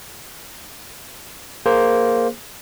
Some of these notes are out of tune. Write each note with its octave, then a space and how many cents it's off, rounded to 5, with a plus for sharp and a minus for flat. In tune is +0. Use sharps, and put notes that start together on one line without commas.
A#3 +0 G#4 +0 C5 +0